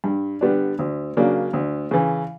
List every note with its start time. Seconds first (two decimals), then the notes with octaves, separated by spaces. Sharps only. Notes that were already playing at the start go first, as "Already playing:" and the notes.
0.04 G2
0.41 D3 G3 B3 D4
0.79 D2
1.17 C#3 F#3 A#3 D4
1.53 D2
1.91 C#3 E3